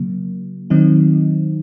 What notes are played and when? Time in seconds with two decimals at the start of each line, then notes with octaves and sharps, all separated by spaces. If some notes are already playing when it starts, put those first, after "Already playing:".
Already playing: C#3 F#3 A#3
0.70 D#3 F#3 C4 D#4